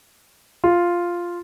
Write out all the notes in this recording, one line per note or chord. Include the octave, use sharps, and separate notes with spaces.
F4